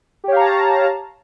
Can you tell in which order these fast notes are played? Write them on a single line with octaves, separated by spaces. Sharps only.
G4 C#5 F5 A#5 A5